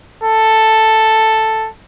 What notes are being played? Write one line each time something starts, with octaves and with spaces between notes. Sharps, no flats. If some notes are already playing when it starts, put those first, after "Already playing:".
A4